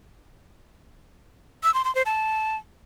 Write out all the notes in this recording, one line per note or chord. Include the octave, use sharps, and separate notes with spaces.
E6
C6
C6
C5
A5